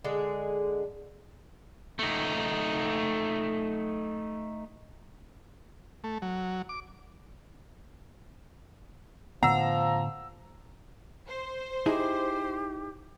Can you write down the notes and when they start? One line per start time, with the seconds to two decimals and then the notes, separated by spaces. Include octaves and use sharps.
0.04 D3 G#3 G#4
1.99 A3 D#4
6.04 A3
6.22 F#3
6.69 D6
9.43 A2 D3 F3 B3 F#5 A#5 E6
11.28 C5
11.86 D#4 E4 G4 G#4